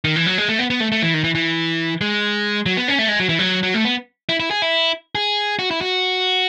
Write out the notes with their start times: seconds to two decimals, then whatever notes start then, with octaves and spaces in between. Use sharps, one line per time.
0.04 D#3
0.16 E3
0.26 F#3
0.38 G#3
0.49 A3
0.59 B3
0.70 B3
0.80 A3
0.92 A3
1.03 E3
1.14 D#3
1.24 E3
1.35 E3
2.01 G#3
2.66 F#3
2.77 B3
2.88 C#4
2.99 A3
3.09 G#3
3.20 F#3
3.29 E3
3.39 F#3
3.63 F#3
3.74 A3
3.85 B3
4.29 E4
4.40 E4
4.51 G#4
4.62 E4
5.15 G#4
5.59 F#4
5.71 E4
5.81 F#4